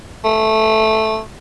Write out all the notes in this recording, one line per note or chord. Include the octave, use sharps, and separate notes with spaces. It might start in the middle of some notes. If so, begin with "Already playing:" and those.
A3